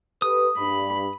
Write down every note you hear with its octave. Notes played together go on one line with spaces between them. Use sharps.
G4 A4 B4 D#6
G2 B5